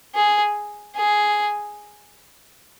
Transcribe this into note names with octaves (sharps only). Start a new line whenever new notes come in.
G#4
G#4